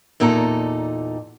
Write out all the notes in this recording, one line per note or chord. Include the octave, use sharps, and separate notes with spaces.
E2 A#2 D#4 A4 A#5